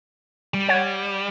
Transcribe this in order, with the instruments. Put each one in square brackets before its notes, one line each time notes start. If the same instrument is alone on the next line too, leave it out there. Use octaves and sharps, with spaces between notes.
[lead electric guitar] G3
[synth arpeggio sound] C#5 F#5 G#6